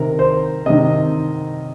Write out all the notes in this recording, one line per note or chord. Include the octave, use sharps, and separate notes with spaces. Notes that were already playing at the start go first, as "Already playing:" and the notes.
Already playing: C3 D#3 A#4
C5
C3 D#3 D#5